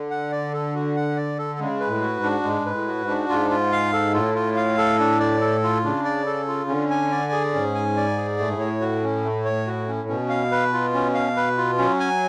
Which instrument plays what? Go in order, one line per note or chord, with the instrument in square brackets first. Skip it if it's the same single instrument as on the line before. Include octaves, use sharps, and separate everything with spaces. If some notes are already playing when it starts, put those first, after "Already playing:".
Already playing: [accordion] D3
[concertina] F#5
D5
A4
F#4
F#5
D5
A4
[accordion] C#3 [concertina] G#3
[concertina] B4
[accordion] A2
[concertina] F#4
[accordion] G#2
[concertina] D4
[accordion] G#2 [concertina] G#3
[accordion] G#2 [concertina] B4
[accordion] A2
[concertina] F#4
[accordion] G#2
[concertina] D4
[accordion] G#2 [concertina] F4
[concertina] F4
F5
A4
[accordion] A2 [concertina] F4
[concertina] F4
F5
A4
D4
D5
A4
F4
[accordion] C#3 [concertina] D4
[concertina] D5
A4
F4
[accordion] D3 [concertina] C#4
[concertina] G#5
D5
G#4
[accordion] G#2 [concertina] C#4
[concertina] G#5
D5
G#4
[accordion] A2 [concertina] A3
[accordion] G#2
A2
[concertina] C#5
F#4
C#4
A3
C#5
F#4
C#4
[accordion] B2 [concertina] C#4
[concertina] F5
B4
F4
C#4
F5
B4
F4
[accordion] F#3 [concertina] C#4
[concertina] G#5